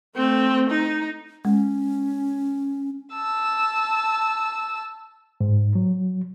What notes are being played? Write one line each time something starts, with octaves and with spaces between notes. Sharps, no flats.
A3 C4
D#4
G#3 C#4
A5 E6
G#2
F#3